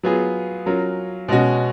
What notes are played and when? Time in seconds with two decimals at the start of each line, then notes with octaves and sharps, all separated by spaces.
0.03 F#3 B3 F4 G#4
0.66 F#3 C#4 F4 A#4
1.28 B2 G#3 C#4 F#4